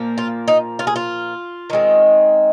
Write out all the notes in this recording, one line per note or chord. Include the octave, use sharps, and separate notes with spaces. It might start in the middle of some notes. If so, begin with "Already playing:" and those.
Already playing: A#2 F3 A#3
F4
D#4
F4
G#4
F4
D#3 G#3 C4